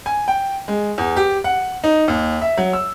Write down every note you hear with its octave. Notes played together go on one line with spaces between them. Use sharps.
G#5
G5
G#3
E2
G4
F#5
D#4
D#2
E5
F#3
E6